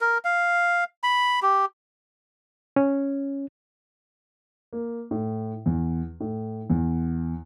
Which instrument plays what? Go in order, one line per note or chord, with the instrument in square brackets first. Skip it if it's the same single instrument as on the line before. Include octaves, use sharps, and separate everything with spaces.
[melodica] A#4
F5
B5
G4
[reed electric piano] C#4
[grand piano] A#3
A2
E2
A2
E2